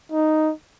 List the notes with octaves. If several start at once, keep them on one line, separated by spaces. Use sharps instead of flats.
D#4